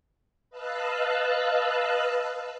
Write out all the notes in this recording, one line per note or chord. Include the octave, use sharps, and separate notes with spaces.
B4 D#5 F5 A5 E6 F#6